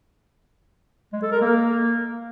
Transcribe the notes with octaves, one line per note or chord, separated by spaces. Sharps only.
G#3
A4
A#4
A#3